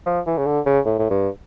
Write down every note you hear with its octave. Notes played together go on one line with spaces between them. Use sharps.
F3
E3
C#3
D3
C#3
A2
A2
G2